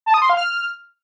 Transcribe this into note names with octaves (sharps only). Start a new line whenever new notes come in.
A5
D#6
C6
F5
F6